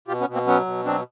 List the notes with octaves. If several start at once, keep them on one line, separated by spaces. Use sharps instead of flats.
B2 F4 G4
B3 C#4
B2
A#3 C4
F#3 B3 C#4
B2
F#3 C4 D4